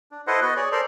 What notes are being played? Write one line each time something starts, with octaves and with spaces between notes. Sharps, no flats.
D4
E4 A4 B4 C5 D#5 F#5
B3 F#4 D#5
G#4 C#5 D5
A4 A#4 C5 D5